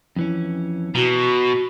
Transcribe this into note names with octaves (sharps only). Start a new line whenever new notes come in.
F2 E3 C#4
B2 F#4 A#5